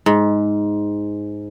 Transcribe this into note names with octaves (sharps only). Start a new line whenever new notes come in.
G#2